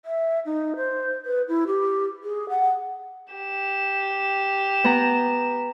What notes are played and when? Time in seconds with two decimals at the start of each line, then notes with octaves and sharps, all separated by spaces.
0.05 E5
0.46 D#4
0.76 C5
1.25 B4
1.48 E4
1.67 G4
2.23 G#4
2.49 F#5
3.33 G4 E7
4.84 B3 A#5